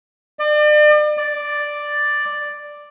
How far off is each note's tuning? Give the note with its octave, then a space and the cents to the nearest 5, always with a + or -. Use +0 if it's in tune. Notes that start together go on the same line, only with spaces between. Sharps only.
D5 +40
D5 +5